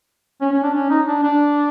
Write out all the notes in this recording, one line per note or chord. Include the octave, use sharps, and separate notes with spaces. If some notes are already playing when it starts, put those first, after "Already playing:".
C#4
C#4
D4
C#4
D#4
D4
D4